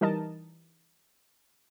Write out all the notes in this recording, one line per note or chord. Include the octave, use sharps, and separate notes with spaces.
E3 G3 D#4 A#4 D#5 A5